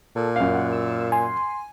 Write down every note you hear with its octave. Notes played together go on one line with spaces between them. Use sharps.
A#2 A4
F#2 C#4 F5
F#5
E6
G#5 C6